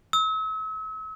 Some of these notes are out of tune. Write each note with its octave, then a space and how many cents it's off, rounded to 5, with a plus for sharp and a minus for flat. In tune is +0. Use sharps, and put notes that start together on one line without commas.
E6 -40